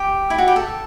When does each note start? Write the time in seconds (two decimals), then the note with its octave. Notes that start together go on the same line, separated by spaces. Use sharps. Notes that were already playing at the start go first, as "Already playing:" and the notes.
Already playing: G4
0.30 E4
0.38 F#4
0.48 G4
0.56 A4